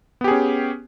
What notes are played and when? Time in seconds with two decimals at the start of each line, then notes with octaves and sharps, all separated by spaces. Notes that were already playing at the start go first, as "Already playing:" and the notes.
0.21 B3
0.24 G4
0.28 G#4
0.31 C#4